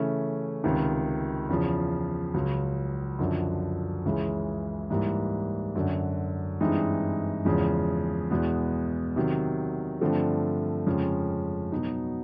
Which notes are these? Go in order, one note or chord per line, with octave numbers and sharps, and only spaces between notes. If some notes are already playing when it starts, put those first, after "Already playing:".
Already playing: C#3 E3 A3 C#4
C#2 C3 D#3
E2 C#3 F3
C#2 C#3 F#3
F#2 D3 F3
C#2 C#3 E3 G#3
G#2 E3 G3 A#3
F#2 D3 F#3
G2 E3 G#3 C4 D#4
E2 C#3 F3 G#3
E2 B2 G#3 B3
C3 D#3 F#3
G2 D3 F3 A3 C4
F2 C#3 F3 G#3 C#4
B2 F#3 B3 D#4